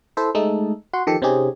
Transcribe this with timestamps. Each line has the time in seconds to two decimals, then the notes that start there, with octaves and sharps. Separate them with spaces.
0.17 E4 A4 C5 E5
0.35 G#3 A3 D#4 A4
0.93 F#4 F#5 C6
1.07 D#3 F3 G4 A4 C#7
1.22 C3 C4 C#4 D#4 G4 G#4